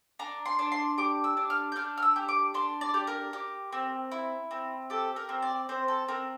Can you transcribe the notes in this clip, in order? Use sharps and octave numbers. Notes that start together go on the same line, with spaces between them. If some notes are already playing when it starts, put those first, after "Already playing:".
D4 A#5
C6
D4
C6
G4 D6
E6
D4
F6
G6
D4 F6
F6
E6
G4
D6
D4 C6
D5
G4
A#4
G4
C4
E4
C4
G4 A4
A#4
C4
D5
C4 C5
A4
C4 A#4